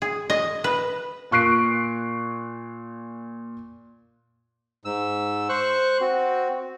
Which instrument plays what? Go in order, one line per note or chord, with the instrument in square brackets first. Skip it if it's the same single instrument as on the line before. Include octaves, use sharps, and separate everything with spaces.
[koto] G#4
D#5
B4
[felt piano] A#2 C#6 F#6 C7 D7
[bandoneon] G#2 E6
C5 C#6 F#6
C4 F#4